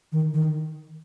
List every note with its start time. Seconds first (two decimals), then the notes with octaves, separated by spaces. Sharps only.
0.12 D#3
0.34 D#3